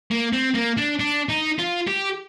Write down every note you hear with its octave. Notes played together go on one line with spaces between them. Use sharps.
A#3
C4
A#3
D4
D4
D#4
F4
G4